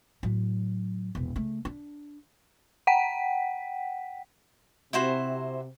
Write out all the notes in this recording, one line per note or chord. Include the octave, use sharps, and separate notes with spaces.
A2 F#3
E1 A#1
C#3 A3
D4
F#5 G5 B6
C3 E4 F#4 C5